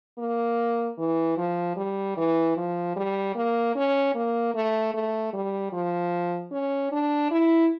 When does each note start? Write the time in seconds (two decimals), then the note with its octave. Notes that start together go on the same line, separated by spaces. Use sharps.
0.18 A#3
0.98 E3
1.37 F3
1.77 G3
2.17 E3
2.57 F3
2.96 G3
3.35 A#3
3.76 C#4
4.15 A#3
4.54 A3
4.94 A3
5.33 G3
5.72 F3
6.52 C#4
6.91 D4
7.31 E4